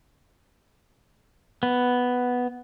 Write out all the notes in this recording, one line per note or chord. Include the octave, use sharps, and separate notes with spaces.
B3